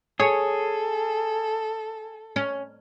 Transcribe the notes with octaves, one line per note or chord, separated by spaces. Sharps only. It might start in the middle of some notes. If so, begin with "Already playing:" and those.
G#4 A4 C#5
C#4